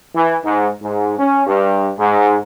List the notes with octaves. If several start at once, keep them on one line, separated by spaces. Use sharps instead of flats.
E3
G#2
G#2
C#4
G2
G#2